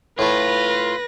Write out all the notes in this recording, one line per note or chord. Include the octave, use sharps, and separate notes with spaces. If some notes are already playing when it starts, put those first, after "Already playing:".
A2 A3 F4 B4 A#6